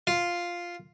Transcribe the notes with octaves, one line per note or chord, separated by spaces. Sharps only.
F4